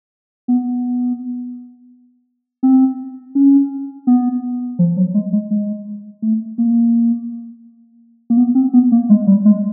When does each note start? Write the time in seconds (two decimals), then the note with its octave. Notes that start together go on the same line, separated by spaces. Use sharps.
0.48 B3
2.63 C4
3.35 C#4
4.07 B3
4.79 F3
4.97 F#3
5.14 G#3
5.33 G#3
5.51 G#3
6.22 A3
6.58 A#3
8.30 A#3
8.37 B3
8.55 C4
8.73 B3
8.92 A#3
9.09 G#3
9.27 G3
9.45 G#3